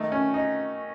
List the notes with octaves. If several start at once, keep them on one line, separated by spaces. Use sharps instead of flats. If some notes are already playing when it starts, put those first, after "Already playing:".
Already playing: D#3 A3 D#4
C#4
D#4